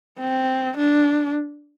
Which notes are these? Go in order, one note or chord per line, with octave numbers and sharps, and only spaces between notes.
C4
D4